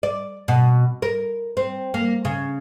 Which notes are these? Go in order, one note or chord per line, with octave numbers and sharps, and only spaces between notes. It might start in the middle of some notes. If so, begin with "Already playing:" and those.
D5
B2
A#4
C4
A#3
C#3